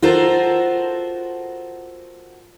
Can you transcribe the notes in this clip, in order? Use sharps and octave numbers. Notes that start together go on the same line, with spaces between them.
F4 F#4 A4 A#4 C5